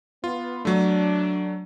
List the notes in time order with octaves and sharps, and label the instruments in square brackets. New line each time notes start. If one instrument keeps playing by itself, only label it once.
[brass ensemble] B3 [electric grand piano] F4
[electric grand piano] F#3 A3 [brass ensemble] D4